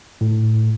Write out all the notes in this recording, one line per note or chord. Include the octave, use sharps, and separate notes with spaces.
A2